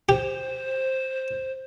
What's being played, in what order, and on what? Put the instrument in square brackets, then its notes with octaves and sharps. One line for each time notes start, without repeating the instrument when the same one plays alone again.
[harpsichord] G4 [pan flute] C5